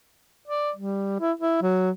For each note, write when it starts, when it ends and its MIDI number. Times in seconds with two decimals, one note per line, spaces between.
0.48 0.71 74
0.76 1.17 55
1.20 1.32 64
1.40 1.57 64
1.62 1.91 54